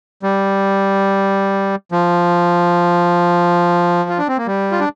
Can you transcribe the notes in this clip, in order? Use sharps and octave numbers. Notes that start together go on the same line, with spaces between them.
G3
F3
F4
D4
C4
A#3
G3
F4
D4